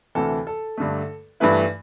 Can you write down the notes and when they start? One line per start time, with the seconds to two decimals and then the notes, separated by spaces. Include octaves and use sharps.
0.15 D2 C3 E3 A4
0.47 A4
0.77 G2 D3 A3
1.40 G2 E3 A3 E4 B4